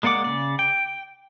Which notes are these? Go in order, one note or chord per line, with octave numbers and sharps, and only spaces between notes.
G#3 A#3 D5 F#5 D6
C#3 D5
G5